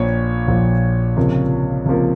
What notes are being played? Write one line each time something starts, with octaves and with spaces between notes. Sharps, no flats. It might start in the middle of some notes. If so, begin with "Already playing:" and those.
Already playing: A#1 A#2 F3 C#5
A#1 A#2 F3
C#2 C3 F3 A#3
C#2 C3 F3 A#3